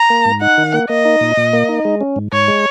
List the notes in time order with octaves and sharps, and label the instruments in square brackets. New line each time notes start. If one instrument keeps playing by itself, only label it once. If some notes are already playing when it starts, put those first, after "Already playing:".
Already playing: [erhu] A#5
[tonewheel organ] A#3
G#2
[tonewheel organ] D#4 [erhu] F#5
[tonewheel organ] D#3
A#3
[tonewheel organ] A#3 [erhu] D#5
[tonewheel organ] D#4
A#2
A#2
A#3
D#4
G#3
C#4
G#2
[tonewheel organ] G#2 [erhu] C#5
[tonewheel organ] G#3